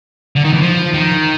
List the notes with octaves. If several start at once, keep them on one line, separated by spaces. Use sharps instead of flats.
D3
D#3
E3
F3
D#3